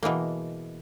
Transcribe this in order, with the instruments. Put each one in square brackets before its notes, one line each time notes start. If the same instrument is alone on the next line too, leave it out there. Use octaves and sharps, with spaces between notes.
[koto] B2 E3 G#3 A#3